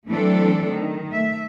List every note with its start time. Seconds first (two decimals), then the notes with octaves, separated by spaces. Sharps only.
0.10 E3 F#3 A3 C4 D4 A4
0.71 D#3
1.12 A3 E5